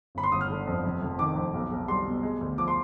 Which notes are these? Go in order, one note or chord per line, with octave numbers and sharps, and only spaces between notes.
G1 B5
C6
G1 D#6
F6
D3
F2
F1
F1
D#3 D6
F2
B1
B1
G3 C6
B2
G#3
D2
F3 D6
C6